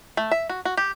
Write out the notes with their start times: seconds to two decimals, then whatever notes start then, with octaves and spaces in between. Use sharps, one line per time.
0.17 A3
0.31 E5
0.49 F#4
0.65 F#4
0.77 G4